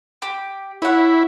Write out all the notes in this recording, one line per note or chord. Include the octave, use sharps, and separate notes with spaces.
G4
E4 C#5 F#5